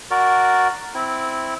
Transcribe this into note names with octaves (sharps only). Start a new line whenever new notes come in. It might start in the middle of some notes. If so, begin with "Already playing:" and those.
F#4 A#4 D5
C4 E4